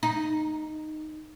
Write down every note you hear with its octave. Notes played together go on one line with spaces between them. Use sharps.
D#4